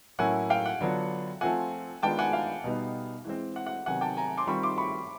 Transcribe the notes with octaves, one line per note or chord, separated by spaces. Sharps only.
A2 F#3 A#3 C#4 E4 F#5 G#5
F5 G5
F#5
D3 F#3 B3 D4 F4
F3 A3 C4 F4 F#5 G#5
D#3 G#3 B3 D4 F4 G5 A5
F#5 G#5
F5
B2 G3 B3 D#4
E3 G#3 C4
F#5
F#5
C3 D#3 F#3 B3 F#5 G#5
G5 A5
G#5 A#5
C6 D6
D#3 G3 C4 F4 B5 C#6
C6 D6
B5 C#6